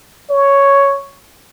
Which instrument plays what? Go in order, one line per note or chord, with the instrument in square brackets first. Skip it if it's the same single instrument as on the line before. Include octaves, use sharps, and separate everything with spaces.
[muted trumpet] C#5